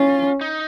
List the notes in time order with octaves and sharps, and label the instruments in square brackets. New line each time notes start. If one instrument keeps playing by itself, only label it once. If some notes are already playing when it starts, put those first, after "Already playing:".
Already playing: [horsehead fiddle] C#4 [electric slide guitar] F4
[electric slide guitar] D#4